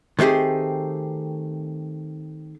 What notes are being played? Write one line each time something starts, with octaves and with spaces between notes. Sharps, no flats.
D#3 A3 C4 G4 G#4